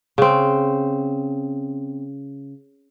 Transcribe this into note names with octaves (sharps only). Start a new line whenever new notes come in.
C#3 C4